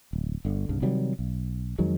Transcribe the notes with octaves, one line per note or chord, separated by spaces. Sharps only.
D1
G1 D3
C2 G2 C#3
C3 D#3 F#3 G3
B1
F2 D#3 F#3 G#3